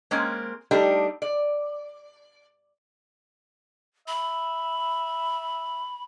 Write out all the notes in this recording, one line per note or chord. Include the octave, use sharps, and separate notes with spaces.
G#3 A#3 C4 C#4
G3 A3 D4 D#4 G4
D5
E5 B5